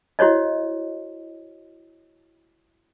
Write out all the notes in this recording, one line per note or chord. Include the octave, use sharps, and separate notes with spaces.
E4 F#4 C5 C#5 D#5